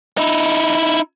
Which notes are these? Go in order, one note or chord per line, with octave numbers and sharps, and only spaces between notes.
D#4 E4